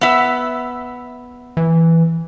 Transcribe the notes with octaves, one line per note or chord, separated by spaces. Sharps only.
B3 E5
E3